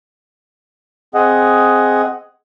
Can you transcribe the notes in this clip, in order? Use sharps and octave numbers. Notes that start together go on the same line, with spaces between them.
C4 G#4 D#5 F#5